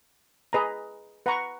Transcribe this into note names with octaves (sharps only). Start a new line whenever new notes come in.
G#4 B4 D#5 A#5
B4 F#5 A#5 C#6